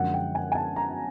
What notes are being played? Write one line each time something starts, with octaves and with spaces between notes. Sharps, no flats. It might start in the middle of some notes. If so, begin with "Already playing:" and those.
Already playing: F#2 D3 F3 G#3 F#5
G5
G#5
G#5
A5
A#5